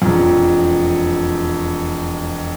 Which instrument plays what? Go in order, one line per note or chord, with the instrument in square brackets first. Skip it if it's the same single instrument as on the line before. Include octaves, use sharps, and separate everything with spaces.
[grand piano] E1 F2